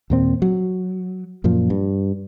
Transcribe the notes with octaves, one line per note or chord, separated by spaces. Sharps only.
D#2 A#2 C4
F#3
F#2 A#2 F3
G2